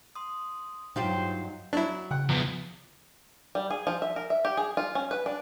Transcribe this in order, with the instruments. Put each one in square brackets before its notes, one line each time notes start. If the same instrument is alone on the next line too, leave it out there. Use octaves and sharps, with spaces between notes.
[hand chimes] C6 D#6
[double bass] G2 F#3 [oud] D#4 F4 G4 [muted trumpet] C5 [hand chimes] G5
[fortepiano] F#3 [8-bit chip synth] D4 E4
[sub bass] C#3 [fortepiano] F#5 G5
[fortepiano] E2 [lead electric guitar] F3 B3
[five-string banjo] G3
G#4
F3
E5
A#4
E5
G4
G#4
F4
C#4
B4
D4